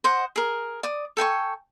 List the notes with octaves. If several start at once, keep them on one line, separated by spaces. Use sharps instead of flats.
C5 D#5 F#5
G#4 A#4
D5 D#6
A4 G5 G#5 C#6